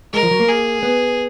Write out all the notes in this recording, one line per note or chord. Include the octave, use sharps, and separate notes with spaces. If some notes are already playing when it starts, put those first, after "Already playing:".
G#3 A#4
F3
F#3
A#3
G#4
B3